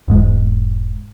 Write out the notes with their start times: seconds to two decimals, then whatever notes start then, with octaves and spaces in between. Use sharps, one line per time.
0.08 E1 G#2 G#3